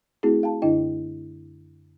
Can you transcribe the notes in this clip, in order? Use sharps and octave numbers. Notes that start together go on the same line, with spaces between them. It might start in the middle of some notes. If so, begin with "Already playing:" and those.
A3 C4 E4 F#4 G#4
F5 G5 A5
F#2 D3 D4 E4 D#5 G5